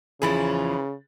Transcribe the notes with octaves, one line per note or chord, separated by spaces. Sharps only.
E2 C#3 E3 F3 G#4 B5 A6